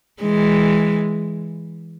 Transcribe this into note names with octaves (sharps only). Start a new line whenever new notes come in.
E3 G#3